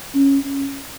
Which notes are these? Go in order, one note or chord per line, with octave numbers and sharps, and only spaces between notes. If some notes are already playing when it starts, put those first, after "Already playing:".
C#4